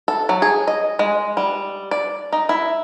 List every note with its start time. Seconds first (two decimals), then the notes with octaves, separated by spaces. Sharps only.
0.08 A4
0.29 F#3
0.42 G#4
0.68 D#5
0.99 G#3
1.37 G3
1.91 D5
2.33 D#4
2.49 E4